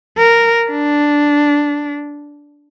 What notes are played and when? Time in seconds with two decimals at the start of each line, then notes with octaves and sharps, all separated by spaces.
0.17 A#4
0.70 D4